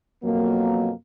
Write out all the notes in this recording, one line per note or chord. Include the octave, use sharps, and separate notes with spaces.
F2 B2 F#3 A#3